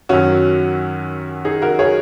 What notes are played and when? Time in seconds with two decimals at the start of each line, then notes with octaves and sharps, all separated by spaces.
0.09 F#2 D#3 F#3 C#4 F#4
1.45 D#4 G#4
1.62 F#4 A#4
1.79 G#4 C#5